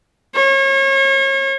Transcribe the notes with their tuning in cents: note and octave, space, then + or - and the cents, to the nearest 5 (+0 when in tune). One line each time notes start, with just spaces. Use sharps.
C#5 -35